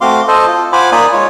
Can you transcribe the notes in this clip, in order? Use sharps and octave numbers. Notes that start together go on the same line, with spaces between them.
A3 C4 F#4 F5 C6 D6
A4 C5 D#5
F4
F4 C5 F#5 G#5 B5 D6
A#3 D#4 D5 G#5 B5 D#6
G#3 F4 C#5